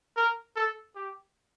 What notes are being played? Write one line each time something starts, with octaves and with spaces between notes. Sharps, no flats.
A#4
A4
G4